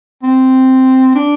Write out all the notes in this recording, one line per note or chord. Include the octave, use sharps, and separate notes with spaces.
C4
D4